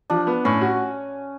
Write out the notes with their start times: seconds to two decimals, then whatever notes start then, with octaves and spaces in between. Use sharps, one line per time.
0.10 F3 D4
0.27 B3
0.45 A2 C#4
0.61 F#4